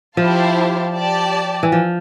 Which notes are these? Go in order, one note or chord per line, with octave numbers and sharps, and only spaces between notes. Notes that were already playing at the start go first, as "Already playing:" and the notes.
F3 E4 G4 C5 F5 A5
G4 D5 A5
E3
F3